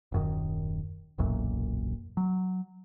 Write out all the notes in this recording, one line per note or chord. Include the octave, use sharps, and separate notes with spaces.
D#1 F#2 D#3
E1 B1 F#2 A#2
F#3